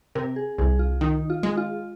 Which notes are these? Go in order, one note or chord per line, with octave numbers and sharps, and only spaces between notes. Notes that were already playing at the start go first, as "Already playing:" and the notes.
C3 A#4
G#4
C2 G#4
F4
D#3 D#4
F4
G#3
F4